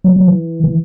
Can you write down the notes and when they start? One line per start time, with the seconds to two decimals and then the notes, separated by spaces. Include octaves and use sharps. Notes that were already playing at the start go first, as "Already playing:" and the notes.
0.04 F#3
0.16 F#3
0.28 E3
0.64 E3